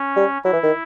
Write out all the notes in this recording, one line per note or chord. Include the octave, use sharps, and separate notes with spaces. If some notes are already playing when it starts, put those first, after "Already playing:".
Already playing: C#4
G3
F#3 E4
E3
D#3